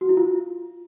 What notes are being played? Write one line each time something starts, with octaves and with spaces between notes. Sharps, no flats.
F#4
E4
F4